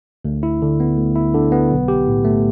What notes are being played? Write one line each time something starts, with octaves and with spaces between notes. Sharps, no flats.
D2
E4
D3
B3
D2
E4
D3
B3
B1
G4
A2
A3